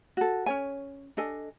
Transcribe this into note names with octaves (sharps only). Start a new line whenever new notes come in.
F#4 A4
C#4 C#5 G#5
D4 A4 D#5 G#5